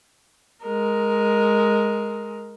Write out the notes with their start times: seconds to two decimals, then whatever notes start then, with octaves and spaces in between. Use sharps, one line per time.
0.64 G#3 A#4